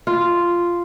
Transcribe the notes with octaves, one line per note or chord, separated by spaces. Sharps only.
F4